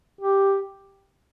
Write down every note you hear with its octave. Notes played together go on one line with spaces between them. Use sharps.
G4